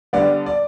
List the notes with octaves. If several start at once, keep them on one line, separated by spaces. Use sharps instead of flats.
D3 G3 B3 D5
D5